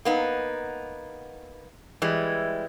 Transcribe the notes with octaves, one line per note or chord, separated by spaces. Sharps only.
A#3 B3 D#4
E3 G3 G#3